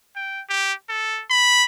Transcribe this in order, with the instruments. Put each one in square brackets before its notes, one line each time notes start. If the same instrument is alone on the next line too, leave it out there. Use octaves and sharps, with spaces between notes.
[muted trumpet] G5
G4
A4
B5